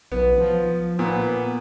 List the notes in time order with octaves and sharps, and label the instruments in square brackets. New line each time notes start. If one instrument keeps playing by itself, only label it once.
[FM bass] B1 [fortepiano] B3
[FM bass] F3
[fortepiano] A#2 [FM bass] B3